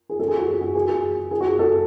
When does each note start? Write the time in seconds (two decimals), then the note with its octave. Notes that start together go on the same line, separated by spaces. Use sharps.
0.10 G#4
0.19 A4
0.28 G#4
0.38 F#4
0.48 G#4
0.61 F#4
0.75 G#4
0.89 G#4
1.31 G#4
1.41 F#4
1.50 G#4
1.59 A4